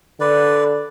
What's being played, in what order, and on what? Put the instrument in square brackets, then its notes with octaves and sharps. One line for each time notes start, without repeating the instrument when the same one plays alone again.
[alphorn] D3 [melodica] B4 D5